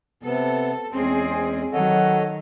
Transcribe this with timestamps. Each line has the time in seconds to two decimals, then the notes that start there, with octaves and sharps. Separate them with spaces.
0.23 C3 B3 A4
0.93 E2 G#3 C4 C#4 G#4
1.73 D#3 F#3 A4 C#5 D#5 F#5